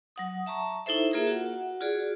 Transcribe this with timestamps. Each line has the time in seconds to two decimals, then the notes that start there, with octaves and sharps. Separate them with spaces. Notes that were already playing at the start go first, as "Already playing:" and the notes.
0.16 F#3 F#5 D#6
0.46 E5 A5 A#5 C#6
0.86 D#4 E4 A4 C5 E5
1.12 A#3 F4 G#4 A#4 E5
1.27 F#4 F#5
1.81 F4 F#4 G#4 D5